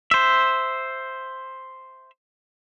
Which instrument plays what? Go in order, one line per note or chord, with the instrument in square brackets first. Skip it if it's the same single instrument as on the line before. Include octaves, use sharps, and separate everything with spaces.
[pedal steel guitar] C5 E5